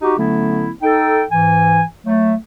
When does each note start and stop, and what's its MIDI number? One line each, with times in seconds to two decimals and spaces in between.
0.02 0.15 63
0.02 0.15 66
0.02 0.15 67
0.17 0.71 50
0.17 0.71 54
0.17 0.71 57
0.17 0.71 59
0.17 0.71 61
0.17 0.71 64
0.82 1.24 63
0.82 1.24 69
0.82 1.24 79
1.30 1.82 44
1.30 1.82 52
1.30 1.82 80
2.05 2.34 54
2.05 2.34 57